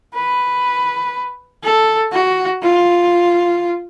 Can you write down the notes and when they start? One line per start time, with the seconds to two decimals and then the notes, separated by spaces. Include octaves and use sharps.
0.15 B4
1.64 A4
2.12 F#4
2.63 F4